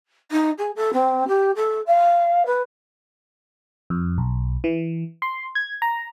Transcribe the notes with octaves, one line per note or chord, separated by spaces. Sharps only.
D#4
G#4
A4
C4
G4
A4
F5
B4
F2
B1
E3
C6
G#6
A#5